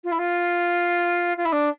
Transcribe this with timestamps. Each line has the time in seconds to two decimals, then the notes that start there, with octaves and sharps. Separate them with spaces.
0.04 F4
0.12 E4
0.18 F4
1.37 F4
1.45 E4
1.52 D4